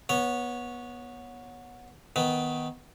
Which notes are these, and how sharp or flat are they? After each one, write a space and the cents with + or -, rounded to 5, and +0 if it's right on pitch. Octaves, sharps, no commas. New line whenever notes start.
B3 -20 C#5 +0
D#3 +15 B3 +0